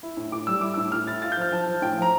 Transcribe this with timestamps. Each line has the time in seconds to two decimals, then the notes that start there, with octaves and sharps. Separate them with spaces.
0.03 E4
0.17 A2
0.32 A2 D6
0.47 G3 E6
0.61 E4 D6
0.74 A2 E6
0.92 A2 F6
1.07 E4 A6
1.22 F4 A6
1.32 G6
1.37 F3 F6
1.52 F3 A5
1.67 F3
1.82 A2 G5
1.98 F3 A#5